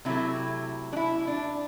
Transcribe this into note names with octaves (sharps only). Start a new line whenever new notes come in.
C3 F#3 A3 E4
D4
E4
D4